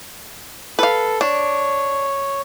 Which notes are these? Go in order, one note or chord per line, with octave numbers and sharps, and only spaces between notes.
A4 B4 F5
D4 C#5